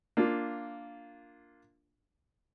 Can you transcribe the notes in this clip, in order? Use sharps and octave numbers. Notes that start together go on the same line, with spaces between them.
A#3 D4 F4